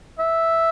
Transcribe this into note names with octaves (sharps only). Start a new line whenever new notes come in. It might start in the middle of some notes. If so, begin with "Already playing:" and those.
E5